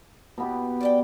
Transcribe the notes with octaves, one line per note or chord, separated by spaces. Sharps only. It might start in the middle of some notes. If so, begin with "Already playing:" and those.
B2 B3 G4
D5 E5 G5